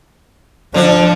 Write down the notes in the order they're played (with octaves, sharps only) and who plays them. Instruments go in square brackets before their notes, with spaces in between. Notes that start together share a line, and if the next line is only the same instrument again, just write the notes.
[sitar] D3 D4 [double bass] F3